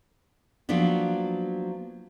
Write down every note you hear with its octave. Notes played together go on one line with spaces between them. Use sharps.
F3 F#3 A#3 B3 D4